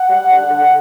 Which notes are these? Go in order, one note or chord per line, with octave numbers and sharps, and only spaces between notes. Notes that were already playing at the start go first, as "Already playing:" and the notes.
Already playing: F#5
G3
D3
D3